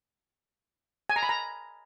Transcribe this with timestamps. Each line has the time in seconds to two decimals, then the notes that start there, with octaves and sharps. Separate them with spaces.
1.10 G#5
1.16 A#5
1.23 B5
1.29 A#5